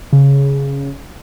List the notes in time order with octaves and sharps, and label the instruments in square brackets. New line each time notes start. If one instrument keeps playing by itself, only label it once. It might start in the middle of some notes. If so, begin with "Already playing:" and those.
[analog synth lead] C#3